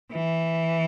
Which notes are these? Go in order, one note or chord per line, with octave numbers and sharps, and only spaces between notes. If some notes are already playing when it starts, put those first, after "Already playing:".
E3